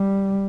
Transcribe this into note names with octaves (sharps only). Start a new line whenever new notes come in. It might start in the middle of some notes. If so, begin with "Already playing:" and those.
Already playing: G3